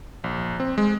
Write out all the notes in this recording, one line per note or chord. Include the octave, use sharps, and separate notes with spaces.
A#1
C4
G#3